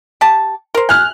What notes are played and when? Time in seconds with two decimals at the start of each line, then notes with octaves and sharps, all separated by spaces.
0.21 G4 A5
0.74 A#4 C5
0.89 G#5 F6 F#6